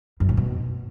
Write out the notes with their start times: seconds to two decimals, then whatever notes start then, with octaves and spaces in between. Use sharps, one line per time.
0.20 F#2
0.29 A2
0.37 B2